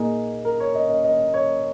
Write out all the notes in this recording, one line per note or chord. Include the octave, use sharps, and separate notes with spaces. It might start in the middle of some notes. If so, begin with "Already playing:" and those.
Already playing: A#2 A#3 D#4 G#4
A#4
C#5
D#5
D#5
D#5
C#5